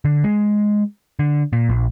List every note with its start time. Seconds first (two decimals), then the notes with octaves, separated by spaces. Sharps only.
0.05 D3
0.24 G#3
1.19 D3
1.53 A#2
1.69 A#1